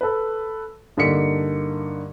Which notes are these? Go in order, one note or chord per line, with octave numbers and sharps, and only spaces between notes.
A4 B4
G2 D3 A#3 D#4 B6 C#7